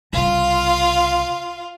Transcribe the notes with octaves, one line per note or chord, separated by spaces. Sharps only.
C2 C#3 F4 F5